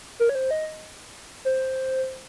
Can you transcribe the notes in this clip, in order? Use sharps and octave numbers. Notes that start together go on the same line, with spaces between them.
A#4
C#5
C5
D#5
C5